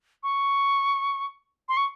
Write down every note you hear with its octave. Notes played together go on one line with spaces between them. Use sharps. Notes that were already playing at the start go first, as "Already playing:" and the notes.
C#6
C6
C#6